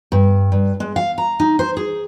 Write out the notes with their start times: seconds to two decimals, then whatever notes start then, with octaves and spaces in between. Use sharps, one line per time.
0.12 G2
0.52 G2
0.80 G#3
0.96 F5
1.18 A#5
1.40 D#4
1.59 C5
1.77 G#4